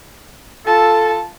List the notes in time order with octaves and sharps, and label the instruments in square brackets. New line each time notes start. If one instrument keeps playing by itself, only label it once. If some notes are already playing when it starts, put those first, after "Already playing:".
[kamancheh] F4 A5 [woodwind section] A4